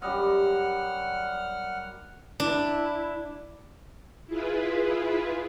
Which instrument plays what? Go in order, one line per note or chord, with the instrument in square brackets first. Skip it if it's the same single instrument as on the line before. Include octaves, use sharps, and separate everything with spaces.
[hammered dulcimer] F#2 G3 D#5 [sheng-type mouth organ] F#5 F6
[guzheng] D4 [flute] E4
[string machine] E4 F4 G#4 B4